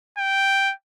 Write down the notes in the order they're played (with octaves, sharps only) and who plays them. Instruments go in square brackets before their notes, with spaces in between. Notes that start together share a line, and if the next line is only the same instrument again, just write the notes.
[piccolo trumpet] G5